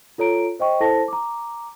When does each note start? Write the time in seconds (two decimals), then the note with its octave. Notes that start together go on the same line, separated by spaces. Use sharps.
0.18 F4 A4 C#5 A#5 D7
0.59 C5 D#5 G5 C#6
0.80 E4 A4 C5 A5 A#6
1.08 A#5 D6